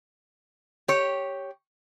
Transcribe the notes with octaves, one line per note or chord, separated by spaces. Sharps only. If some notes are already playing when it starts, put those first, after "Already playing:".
G4 C#5